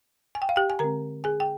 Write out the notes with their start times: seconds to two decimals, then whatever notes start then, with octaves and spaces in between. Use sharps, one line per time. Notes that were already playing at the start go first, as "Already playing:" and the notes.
0.35 G#5
0.42 G5
0.49 F5
0.56 G4 G5
0.70 G#5
0.79 D3 G#3 C4 A#4 A#5
1.24 G#4 G#5
1.40 G5